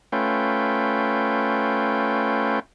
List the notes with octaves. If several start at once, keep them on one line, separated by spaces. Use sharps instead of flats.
A3 C#4 F4 B4 G5